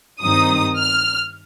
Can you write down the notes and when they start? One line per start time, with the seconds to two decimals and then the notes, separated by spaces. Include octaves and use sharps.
0.23 G2 D#3 C4 D#4 D#6
0.79 F6